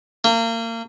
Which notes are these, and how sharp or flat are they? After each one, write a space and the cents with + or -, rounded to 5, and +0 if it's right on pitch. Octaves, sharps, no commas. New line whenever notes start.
A#3 -30